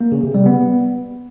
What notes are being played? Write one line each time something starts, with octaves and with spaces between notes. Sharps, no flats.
A#3
C#3
C3
G3
B3